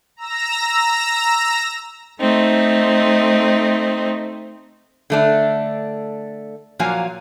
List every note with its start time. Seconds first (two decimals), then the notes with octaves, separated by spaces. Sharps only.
0.16 A#5 E6 A#6
2.19 A3 C4 D#4
5.10 D3 A3 D4
6.79 A#2 F3 F#3 A#3 F5 G#5